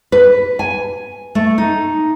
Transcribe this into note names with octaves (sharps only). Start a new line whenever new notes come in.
B4
G#5
A3
D#4